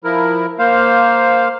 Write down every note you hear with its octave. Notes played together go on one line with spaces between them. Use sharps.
F3 E4 A#4
A#3 C5 F5